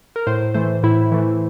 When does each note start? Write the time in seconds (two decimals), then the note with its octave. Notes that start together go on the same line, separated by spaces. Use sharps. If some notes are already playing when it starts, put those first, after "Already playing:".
0.16 A#4
0.27 A2 C5
0.54 E3 A3 C5
0.83 A2 E4
1.12 E3 A3